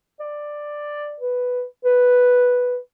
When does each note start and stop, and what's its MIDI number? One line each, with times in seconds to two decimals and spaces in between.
0.20 1.15 74
1.20 1.64 71
1.85 2.78 71